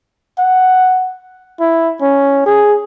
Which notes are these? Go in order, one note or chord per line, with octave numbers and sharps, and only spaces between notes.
F#5
E4
C#4
G#4